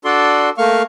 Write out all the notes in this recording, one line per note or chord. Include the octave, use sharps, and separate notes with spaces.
D4 F#4 A4 D5 C6
A3 A#3 F5 C#6 F6